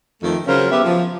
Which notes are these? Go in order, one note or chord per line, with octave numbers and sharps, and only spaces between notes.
F2 D#3 F3 A3
C#3 F#3 C#4 F4 A#4 C5
B3 G4 E5
F3